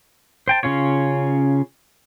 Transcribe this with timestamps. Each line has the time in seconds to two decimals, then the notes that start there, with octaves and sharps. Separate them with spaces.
0.48 C5 G5 A5
0.63 C#3 C#4 F4 C#5